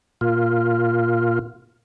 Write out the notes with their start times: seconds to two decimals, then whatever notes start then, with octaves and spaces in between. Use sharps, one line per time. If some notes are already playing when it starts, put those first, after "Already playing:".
0.21 A#2 F4